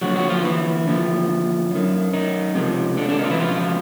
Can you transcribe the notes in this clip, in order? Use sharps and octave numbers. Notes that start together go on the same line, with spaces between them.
D#2 D3 F3 F#3 F#4
F#3 F#4
F3 F4
E3 E4
D#2 D3 F3
F#2 D#3
D#3 D#4
C#2 C3 F3
D3 D4
D3 D4
D#3 D#4
F4
E3 E4
C#2 B2 F3 F4